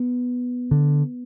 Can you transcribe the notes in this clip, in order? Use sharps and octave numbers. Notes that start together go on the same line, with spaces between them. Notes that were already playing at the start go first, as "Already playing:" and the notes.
Already playing: B3
D3